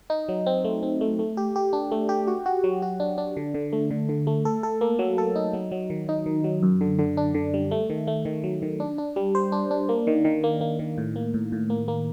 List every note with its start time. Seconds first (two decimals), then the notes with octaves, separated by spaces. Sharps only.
0.10 D#4
0.29 F#3
0.46 C4
0.64 A3
0.83 C4
1.01 A3
1.19 A3
1.37 G4
1.56 G4
1.73 D4
1.91 A3
2.09 G4
2.27 F#4
2.46 F#4
2.64 F#3
2.82 F#4
3.00 D4
3.18 D4
3.37 D3
3.54 D3
3.73 A3
3.91 D3
4.09 D3
4.27 A3
4.45 A4
4.63 A4
4.81 A#3
4.99 F#3
5.18 A4
5.36 D#4
5.53 F#3
5.72 F#3
5.90 D#3
6.09 D#4
6.26 D#3
6.44 F#3
6.63 F#2
6.81 D3
6.99 D3
7.17 D4
7.35 D3
7.54 G3
7.71 A3
7.90 D#3
8.07 A3
8.25 D#3
8.44 F#3
8.62 D#3
8.80 D4
8.98 D4
9.16 G3
9.35 C5
9.52 D4
9.71 D4
9.89 A#3
10.07 D#3
10.25 D#3
10.44 A#3
10.61 A#3
10.79 D#3
10.98 A2
11.16 A#3
11.34 A2
11.52 A2
11.70 A#3
11.88 A#3